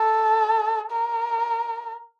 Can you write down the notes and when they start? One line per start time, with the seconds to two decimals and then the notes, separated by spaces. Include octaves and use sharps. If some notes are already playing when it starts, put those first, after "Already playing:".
Already playing: A4
0.91 A#4